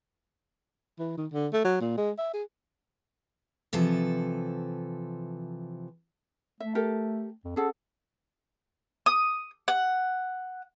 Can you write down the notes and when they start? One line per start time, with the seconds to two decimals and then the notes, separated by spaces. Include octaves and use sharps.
0.99 E3
1.17 D#3
1.32 D3
1.53 A3
1.64 F#3
1.81 A#2
1.97 G#3
2.18 E5
2.33 G#4
3.73 C3 E3 F3 A4
6.60 A3 E5
6.75 G4 A4 A#4
7.44 F2
7.56 C#4 G#4 A4 F#5
9.06 D#6
9.68 F#5